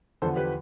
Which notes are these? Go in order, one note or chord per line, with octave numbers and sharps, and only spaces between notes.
E2 D3 F3 B3 A4 C5
G4 B4